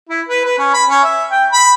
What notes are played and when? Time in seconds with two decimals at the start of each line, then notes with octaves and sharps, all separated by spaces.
0.09 E4
0.29 B4
0.45 B4
0.59 C#4
0.74 B5
0.90 C#4
1.04 E5
1.31 G5
1.53 B5